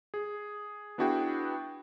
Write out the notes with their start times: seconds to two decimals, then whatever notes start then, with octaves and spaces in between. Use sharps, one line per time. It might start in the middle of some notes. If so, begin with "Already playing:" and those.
0.14 G#4
0.98 B3 D4 E4 F#4 G#4 G5